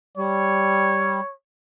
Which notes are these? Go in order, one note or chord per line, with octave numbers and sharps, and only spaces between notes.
G3 C#5